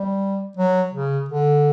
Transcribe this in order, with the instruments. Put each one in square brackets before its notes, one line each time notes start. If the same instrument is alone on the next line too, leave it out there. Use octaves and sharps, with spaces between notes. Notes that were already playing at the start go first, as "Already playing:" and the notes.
Already playing: [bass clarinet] G3
F#3
C#3
D3